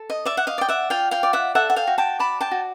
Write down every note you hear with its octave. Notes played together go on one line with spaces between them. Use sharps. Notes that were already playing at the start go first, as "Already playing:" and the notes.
Already playing: A4
D#5
D5 E5
F#5
D#5 F5
D5 G5
E5 F#5
F4 F5 G5
F5 G5
D5
E5 F#5
A4 E5 F#5
F#5
F5 G5
F#4
G5 A5
D5 A5 B5
G5 A5
F#4